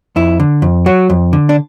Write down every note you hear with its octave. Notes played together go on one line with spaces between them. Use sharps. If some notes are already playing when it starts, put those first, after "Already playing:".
F2 E4
D3
F2
F#3 F#4
F2
D3
D4